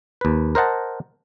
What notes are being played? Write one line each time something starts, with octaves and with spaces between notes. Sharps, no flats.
D#2 B4
A#4 C5 D#5 F#5 A5